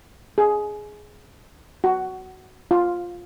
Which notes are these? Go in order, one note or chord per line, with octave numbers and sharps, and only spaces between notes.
G#4
F#4
F4